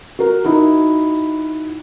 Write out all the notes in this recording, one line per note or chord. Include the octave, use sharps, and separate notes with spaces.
F#4 A#4
D#4 E4 F#4